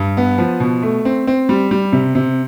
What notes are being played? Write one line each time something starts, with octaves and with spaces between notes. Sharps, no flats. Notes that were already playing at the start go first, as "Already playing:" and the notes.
Already playing: G2
B3
F3
B2
A3
C4
C4
G3
G3
C3
C3